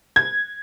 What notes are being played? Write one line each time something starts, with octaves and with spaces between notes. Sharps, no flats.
G#6